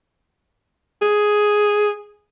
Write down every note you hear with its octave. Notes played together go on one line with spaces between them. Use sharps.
G#4